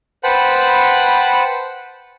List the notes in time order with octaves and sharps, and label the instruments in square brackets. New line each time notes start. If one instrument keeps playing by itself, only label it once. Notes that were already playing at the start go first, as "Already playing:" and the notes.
[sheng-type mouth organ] B4 C5 F#5 G5 A5 B5